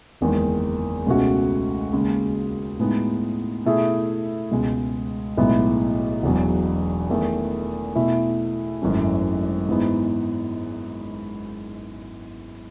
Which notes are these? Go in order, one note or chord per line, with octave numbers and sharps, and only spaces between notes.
F#1 E2 D#3 G#3
C#2 B2 A3 C#4 F#4
D#2 C#3 G#3
A2 G#3 B3 D#4
B2 A3 E4 G#4
C#2 B2 G#3
B1 A2 G#3 B3 E4
E1 E2 B2 F#3
E2 D#3 A3
B2 A3 E4
G#1 F#2 E3 A3 C#4
G#2 E3 B3 D#4